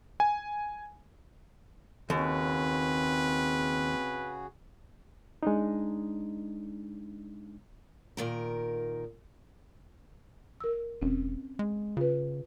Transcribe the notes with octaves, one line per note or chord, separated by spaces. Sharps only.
G#5
D#2 C#3 C4 F#4 G#4 B4
G#3 D4 D#4
A#2 D#3 A#4
A#4 E6
E1 C4 C#4
G#3
C#3 F4 B4